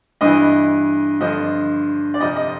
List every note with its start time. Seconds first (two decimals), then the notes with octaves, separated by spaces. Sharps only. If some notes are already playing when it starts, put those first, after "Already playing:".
0.21 G2 E3 D#5
1.20 G2 D3 F3 D#5
2.14 D5
2.20 F2 C3 F3 D#5
2.36 D#5